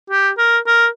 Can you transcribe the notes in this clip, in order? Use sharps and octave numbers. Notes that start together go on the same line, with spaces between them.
G4
A#4
A#4